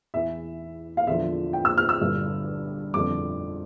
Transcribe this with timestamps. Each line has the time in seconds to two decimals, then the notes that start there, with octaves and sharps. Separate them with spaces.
0.14 E2 E3 E5
0.97 F5
1.07 E2 D3 F3 E5
1.53 G5
1.65 E6
1.77 F6
1.89 E6
2.01 G1 G2 D3
2.94 G1 F2 D3 D6